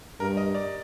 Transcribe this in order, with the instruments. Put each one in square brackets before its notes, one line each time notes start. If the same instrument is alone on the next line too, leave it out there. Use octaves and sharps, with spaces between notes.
[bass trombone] G2 [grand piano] A#4
[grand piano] D#5
D5